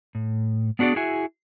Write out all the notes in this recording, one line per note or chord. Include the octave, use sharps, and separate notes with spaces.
A2
B3 D4 F#4 G#4 D5
E4 F#4 G#4 E5 G#5